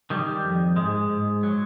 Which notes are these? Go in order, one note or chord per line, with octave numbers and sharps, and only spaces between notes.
D#3 G3
F2
G#2 G#3
G#2
F#3